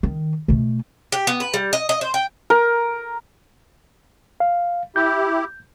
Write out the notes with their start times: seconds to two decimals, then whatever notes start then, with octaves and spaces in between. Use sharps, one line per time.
0.03 D#3
0.48 B2 A3
1.12 G4
1.27 B3
1.40 B4
1.54 G3
1.73 D#5
1.89 D#5
2.01 C5
2.14 G5
2.50 A#4
4.40 F5
4.96 E4 G4 G6